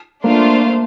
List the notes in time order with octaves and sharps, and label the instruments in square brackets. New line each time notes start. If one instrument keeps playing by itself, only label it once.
[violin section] A3 D4 F4 C5 F5 [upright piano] A#3